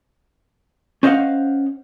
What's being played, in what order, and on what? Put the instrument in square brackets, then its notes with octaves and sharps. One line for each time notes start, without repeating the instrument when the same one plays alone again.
[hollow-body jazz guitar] C#4 C5 D#5 F5 F#5